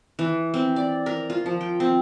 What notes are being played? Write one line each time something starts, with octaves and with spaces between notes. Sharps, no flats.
E3
C4
D5
A#4
F4
F3
G5
C4